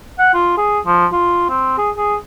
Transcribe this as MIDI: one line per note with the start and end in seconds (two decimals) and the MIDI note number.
0.19 0.34 78
0.34 0.53 65
0.57 0.79 68
0.86 1.06 53
1.12 1.45 65
1.49 1.75 60
1.78 1.90 68
1.97 2.16 68